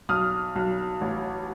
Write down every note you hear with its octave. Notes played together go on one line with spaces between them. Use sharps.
B1 D#6 F6
B1
A1